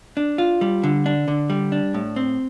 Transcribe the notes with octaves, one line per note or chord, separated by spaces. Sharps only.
D4
F4
G3
D3
D4
D3
G3
D4
A2
C4